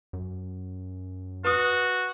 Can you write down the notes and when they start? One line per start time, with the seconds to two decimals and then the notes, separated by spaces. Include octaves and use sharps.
0.13 F#2
1.44 F#4 B4 D#6